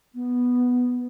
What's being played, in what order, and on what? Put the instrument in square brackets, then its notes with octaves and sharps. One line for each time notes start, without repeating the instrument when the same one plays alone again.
[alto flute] B3